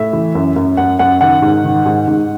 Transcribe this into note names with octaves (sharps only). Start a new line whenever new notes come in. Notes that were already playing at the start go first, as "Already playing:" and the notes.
Already playing: A2 E5
E3
F#2
F#2
F#2 F#5
F#2 F#5
D#3 F#5
G#2
D#3
G#2
G#2